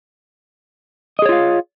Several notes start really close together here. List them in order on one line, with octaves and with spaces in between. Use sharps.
D#5 G#4 C#5 F4 F5